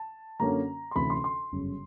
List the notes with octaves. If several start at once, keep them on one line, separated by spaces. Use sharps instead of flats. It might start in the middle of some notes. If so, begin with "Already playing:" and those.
Already playing: A5
F#2 D3 F#3 A#3 C#4 A#5
C6
D2 C3 E3 A3 C#4 B5
C6
C6
G1 F#2 C#3